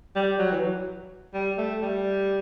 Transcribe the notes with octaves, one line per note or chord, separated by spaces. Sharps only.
G3
F#3
E3
F#3
G3
A3
G3